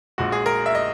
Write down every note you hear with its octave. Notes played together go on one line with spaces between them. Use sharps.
A#1 A#2 G#3 F#4
G#4
A#4
E5
D#5